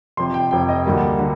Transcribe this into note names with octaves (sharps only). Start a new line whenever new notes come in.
F1 F2 C3 C6
G5
F1 F2 C3 G5
D#5
D2 D3 G3 A#3
D3 G3